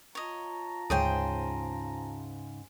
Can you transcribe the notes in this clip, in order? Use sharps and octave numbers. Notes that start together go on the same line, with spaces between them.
F4 C#5 D#5 A5 A#5
D2 G#2 C#3 G#4 C5 C#5 G5